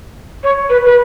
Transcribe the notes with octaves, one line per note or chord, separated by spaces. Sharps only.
C#5
B4
B4